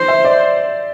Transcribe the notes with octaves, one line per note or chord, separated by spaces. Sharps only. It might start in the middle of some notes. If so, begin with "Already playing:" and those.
Already playing: C5
E5
D5